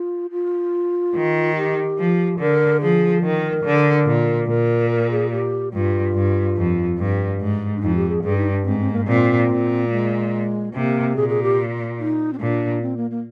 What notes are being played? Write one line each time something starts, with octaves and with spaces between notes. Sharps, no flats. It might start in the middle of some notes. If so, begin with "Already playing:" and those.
Already playing: F4
F4
D#3
G4
F3
D3 A#4
F3 G#4
D#3 A#4
D3
A#2
A#2 A#4
A#4
G#4
G4
G2 F4
G2
F2
G2
G#2
D4
F2 D#4
G4
G#4
G2 G#4
D#4
D4
G#2 C4
C4
A#3
A#2 C4
A#2
G#3
C3 A#3
A#2 G#4
G#4
G4
D#4
C4
A#2 D4
C4
A#3
A#3